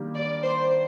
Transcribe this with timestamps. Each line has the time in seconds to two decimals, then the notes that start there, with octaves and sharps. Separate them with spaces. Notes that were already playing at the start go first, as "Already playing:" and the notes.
Already playing: D#3 G3 A#3 D4
0.15 D5
0.43 C5